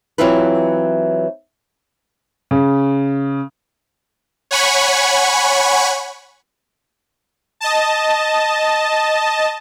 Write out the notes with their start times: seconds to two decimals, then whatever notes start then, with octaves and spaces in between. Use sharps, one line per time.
0.18 E3 F#3 C4 E4 F4 B4
2.51 C#3
4.51 C#5 F#5 G#5 B5 C#6
7.60 D#5 A5